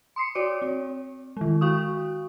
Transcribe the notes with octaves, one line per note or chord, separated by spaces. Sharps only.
C6 D#6 C7 C#7
F#4 C#5 D5 D6 C#7
C4
D#3 G#3
F#4 F5 C#6 D#6